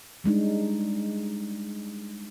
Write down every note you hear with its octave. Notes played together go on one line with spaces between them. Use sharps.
G3 G#3 D4 D#4